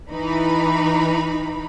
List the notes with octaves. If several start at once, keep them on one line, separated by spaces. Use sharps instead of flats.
E3 D#4 B5